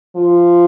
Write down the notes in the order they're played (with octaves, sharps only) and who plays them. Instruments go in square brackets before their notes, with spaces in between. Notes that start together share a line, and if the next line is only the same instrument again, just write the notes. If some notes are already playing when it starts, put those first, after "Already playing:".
[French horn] F3